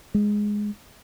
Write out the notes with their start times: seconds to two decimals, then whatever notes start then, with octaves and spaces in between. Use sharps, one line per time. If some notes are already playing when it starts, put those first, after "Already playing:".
0.14 G#3